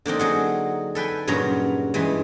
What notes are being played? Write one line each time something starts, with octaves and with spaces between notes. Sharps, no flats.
D3 A#3 C4 D#4
F#3 G#4 F#5
A4 B4 G5 G#5
G2 A#2 C#3 F#3 C#5 A#5
G2 E3 G#3